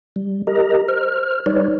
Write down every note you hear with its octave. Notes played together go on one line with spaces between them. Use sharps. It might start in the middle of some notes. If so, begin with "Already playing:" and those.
G3
G4 A#4 D#5 A#5
C5 F6
G3 D#4 B4 C#5 D5